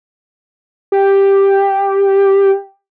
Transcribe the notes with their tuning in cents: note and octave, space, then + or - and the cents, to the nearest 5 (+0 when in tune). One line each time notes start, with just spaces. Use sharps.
G4 +5